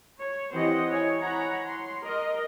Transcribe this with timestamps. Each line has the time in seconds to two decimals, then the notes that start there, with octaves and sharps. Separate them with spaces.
0.21 C#5
0.53 E3 C4 G4 C5 D#5 F#5
0.88 E4 C#5 G#5
1.20 C#5 F#5 A#5 B5
1.66 C6
2.03 A#4 D#5